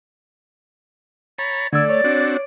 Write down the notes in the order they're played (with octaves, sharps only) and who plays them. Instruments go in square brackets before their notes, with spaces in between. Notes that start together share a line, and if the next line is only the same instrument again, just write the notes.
[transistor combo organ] C#5 A#5 B5 [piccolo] A6
[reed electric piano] D3 E6 [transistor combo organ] A3 [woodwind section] D5 [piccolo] G#6
[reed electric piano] C#5 [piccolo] A6
[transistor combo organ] C4 D4 F#4